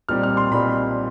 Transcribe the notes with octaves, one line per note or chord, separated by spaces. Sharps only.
B1 A#2 G3 C4 F6
F6
C6
B1 A#2 G3 C4 B5